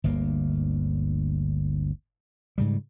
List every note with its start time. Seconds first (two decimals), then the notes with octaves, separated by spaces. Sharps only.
0.04 G1 D2 A#3
2.58 G#2 C#3 G3